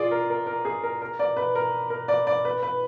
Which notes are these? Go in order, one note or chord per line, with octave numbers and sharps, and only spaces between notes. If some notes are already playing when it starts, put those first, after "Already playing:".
Already playing: F4 G#4 D5
A#4
A#4
A#4
G#4
A#4
A#4
D5
B4
A#4
A#4
D5
D5
B4
B4